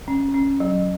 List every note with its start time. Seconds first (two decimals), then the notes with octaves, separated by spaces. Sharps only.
0.08 C#4
0.34 C#4
0.60 F#3